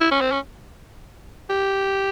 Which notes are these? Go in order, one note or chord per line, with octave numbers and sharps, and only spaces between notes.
E4
C#4
C4
C#4
G4